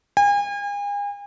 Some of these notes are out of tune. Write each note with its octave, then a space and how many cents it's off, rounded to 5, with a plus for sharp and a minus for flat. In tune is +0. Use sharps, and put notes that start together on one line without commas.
G#5 -40